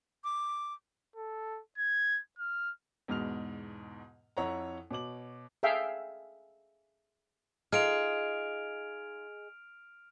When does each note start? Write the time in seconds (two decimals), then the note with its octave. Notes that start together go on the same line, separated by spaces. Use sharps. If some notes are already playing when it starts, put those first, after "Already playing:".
0.24 D6
1.16 A4
1.78 G#6
2.39 F6
3.08 E2 G#2 B2 F6 F7
4.37 F2 E4 C#5 F#5 A#5
4.91 B2 C#5 D6 F#7
5.63 G#4 A4 E5 F5 G5
7.72 D#4 F4 G#4 D#5 F6 D7 F7